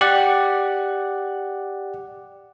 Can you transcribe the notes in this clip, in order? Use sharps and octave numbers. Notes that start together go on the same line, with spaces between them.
G4 D5 F#5